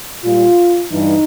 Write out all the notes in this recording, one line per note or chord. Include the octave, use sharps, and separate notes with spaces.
A#2 G3 F4
G2 E3 G3 D#4